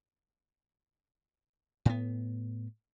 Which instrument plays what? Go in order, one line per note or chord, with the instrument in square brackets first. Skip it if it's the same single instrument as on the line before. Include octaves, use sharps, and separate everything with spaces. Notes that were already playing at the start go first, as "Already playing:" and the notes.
[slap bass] A2 B3